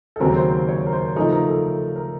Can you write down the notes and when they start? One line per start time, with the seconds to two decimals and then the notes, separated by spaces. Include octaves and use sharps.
0.16 A4
0.20 D#2 C#3 F#3 C4 A#4
0.36 C5
0.68 C#5
0.86 A#4
0.93 C5
1.16 C#3 F3 A3 D#4 A#4
1.32 A#4
1.48 A4
1.64 A4
1.96 A#4